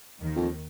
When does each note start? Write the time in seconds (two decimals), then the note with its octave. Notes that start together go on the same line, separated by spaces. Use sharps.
0.21 D#2 D#3
0.36 F2